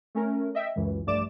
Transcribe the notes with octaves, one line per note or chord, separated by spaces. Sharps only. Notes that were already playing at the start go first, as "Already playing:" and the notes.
A3 C#4 A#4
D#5 E5 G5
C#2 F#2 E3
A#1 G2 A3 D5 D6 E7